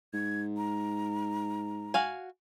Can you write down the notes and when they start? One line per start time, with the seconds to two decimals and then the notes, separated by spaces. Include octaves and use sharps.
0.14 G#2 G#6
0.57 A#5
1.94 F#4 F5 G#5